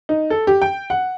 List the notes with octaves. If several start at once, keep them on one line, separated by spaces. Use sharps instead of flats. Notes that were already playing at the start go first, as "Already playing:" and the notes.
D#4
A4
G4
G5
F#5